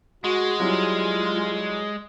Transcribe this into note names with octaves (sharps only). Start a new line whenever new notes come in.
G#3 F#4
F#3 G3 E4 F4